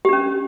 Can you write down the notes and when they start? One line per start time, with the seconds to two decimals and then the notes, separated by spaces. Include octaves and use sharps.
0.05 G4
0.09 D4
0.13 C#4